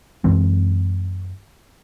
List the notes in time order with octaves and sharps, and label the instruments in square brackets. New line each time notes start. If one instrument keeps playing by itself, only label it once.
[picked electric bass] F#2 E3 G#3 C4